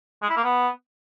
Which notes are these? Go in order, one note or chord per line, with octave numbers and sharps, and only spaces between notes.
G#3
E4
A#3
B3